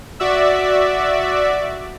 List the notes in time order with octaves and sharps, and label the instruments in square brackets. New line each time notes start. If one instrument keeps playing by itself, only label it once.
[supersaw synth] F#4 D5 E5